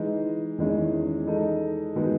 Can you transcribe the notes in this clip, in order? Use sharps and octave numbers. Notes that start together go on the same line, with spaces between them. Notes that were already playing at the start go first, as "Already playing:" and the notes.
Already playing: E3 G#3 D#4
E2 D#3 G#3 C#4 E4
G#3 D#4 A4 D#5
D#3 G#3 B3 F#4